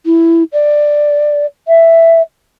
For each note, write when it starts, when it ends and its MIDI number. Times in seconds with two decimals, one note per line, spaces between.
0.06 0.43 64
0.53 1.46 74
1.68 2.22 76